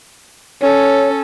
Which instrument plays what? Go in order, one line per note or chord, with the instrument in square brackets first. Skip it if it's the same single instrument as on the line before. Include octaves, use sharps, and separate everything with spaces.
[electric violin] C#4 A4 [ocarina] C#5